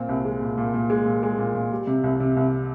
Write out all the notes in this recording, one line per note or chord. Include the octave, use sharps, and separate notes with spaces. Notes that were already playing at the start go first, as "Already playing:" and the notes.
Already playing: A#2 C4
C2
G#3
A#2
A#2
A#2
G#3
A#2
G#3
A#2
A#2
G3
C3
C2
C3
C2